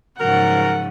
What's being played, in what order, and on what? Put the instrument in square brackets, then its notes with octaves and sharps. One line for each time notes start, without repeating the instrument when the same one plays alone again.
[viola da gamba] G#2 C#3 F3 [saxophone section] F#3 A#4 [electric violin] F#5